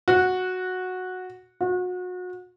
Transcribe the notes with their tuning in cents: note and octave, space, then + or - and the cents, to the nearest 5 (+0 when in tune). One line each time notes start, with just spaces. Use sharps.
F#4 -10
F#4 -35